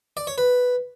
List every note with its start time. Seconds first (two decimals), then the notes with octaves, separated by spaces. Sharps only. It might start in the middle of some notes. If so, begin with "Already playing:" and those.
0.17 D5
0.27 C#5
0.38 B4